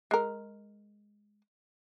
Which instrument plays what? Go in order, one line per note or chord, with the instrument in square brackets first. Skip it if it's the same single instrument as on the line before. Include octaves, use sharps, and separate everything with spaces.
[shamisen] G#3 A#4